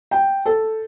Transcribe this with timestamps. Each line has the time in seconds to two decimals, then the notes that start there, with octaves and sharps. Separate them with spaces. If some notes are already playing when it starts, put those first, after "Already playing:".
0.11 G5
0.46 A4